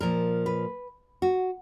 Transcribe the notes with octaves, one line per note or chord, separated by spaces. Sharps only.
A#2 F3 A#4
B4
F#4